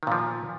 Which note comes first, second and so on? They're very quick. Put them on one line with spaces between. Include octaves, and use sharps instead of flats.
D#3 A#2 F3